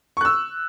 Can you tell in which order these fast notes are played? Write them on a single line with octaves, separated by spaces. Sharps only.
C#6 F#6 E6